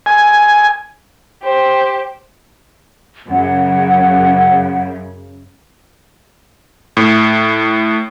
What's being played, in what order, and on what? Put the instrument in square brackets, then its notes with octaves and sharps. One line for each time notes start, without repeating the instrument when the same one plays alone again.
[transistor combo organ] G#5
[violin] G4 C5
[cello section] F#2 C#3 [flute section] F#5
[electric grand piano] A2